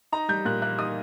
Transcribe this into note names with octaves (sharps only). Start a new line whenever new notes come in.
D#4 A#5
G3 G6
A#2 F#6
A#3 F#6
D#4 D#6